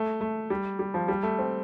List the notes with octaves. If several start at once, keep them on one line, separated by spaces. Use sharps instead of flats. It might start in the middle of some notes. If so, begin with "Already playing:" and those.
Already playing: A3
A3
G3
G3
F3
G3
A3
C4